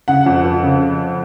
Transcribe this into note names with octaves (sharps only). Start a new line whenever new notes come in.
C#3 F#5
F2
F3
C#3